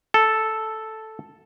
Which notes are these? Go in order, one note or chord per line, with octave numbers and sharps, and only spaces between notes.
A4